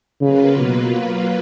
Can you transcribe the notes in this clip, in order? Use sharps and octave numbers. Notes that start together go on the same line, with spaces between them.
C#3 F#3 A#3 F4 B4
B2